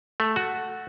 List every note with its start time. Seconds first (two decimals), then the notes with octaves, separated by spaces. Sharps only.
0.20 A3
0.36 F#4